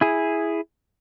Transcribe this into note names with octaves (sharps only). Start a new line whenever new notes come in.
E4 G#4